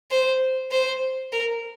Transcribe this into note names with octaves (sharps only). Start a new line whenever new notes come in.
C5
C5
A#4